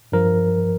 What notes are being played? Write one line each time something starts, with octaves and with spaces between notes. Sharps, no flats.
G2 F3 A#4